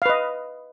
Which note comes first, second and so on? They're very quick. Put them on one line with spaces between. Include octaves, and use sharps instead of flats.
F5 B4 D#5